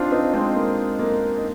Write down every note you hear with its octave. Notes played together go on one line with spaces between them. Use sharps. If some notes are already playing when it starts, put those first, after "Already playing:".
Already playing: C4 D4 D#4 F4
C4 D#4
G#3 C4
A#3
A#3
D#4